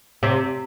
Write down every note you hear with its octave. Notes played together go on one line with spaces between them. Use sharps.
C3